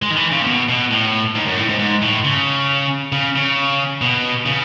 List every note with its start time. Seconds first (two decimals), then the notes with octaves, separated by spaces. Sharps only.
0.02 G#3
0.10 D#3
0.16 E3
0.32 C#3
0.42 A2
0.46 B2
0.69 B2
0.91 A2
1.35 G#2
1.46 F#2
1.57 A2
1.69 G#2
1.79 G#2
2.02 A2
2.24 C#3
3.12 C#3
3.35 C#3
4.02 B2
4.46 C#3